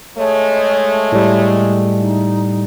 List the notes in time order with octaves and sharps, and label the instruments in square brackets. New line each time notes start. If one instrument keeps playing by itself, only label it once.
[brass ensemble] G#3 A3 [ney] C#5
[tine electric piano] A2 G3
[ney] D#4